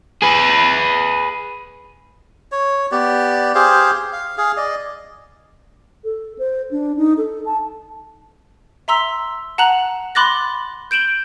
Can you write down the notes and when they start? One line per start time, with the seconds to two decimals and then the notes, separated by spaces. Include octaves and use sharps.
0.22 G#4 B4
2.52 C#5
2.92 B3 G4 D5
3.55 G4 G#4 C5 F5
4.13 F5
4.38 G#4 F5
4.57 D5 D#5
6.04 A4
6.38 C5
6.71 D4
6.97 D#4
7.18 A4
7.46 A5
8.88 E5 A#5 C6 E6 B6
9.58 F#5 A5 A#5 F#6 F#7
10.15 B5 C6 D6 F#6 A6 A#6
10.91 G6 D7 E7 F#7 G7